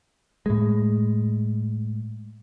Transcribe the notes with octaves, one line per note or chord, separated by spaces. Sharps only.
A2 G#3